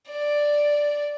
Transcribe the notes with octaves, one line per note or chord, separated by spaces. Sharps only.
D5